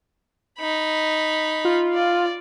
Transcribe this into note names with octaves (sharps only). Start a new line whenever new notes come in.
D#4 B5
F4
D5